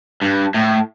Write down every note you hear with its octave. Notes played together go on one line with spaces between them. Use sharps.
G2
A2